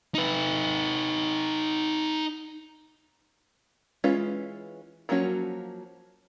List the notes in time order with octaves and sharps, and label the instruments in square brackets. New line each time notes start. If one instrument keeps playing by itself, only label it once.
[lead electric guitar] D#4 B4
[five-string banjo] E3 G#3 C#4 F4 B4
F3 F#3 A#3 C#4 F#4